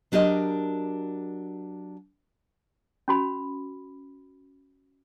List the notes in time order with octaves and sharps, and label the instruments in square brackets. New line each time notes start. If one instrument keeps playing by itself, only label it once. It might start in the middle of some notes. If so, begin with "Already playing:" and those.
[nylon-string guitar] F#3 D4 G4 A#4 D#5
[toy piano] C#4 F#4 B5